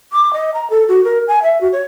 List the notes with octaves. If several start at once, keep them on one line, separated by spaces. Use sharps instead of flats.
D6
D#5
A#5
A4
F#4
A#4
G#5
E5
F#4
C#5